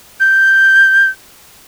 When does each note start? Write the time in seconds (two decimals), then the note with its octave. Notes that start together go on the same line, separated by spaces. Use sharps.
0.20 G6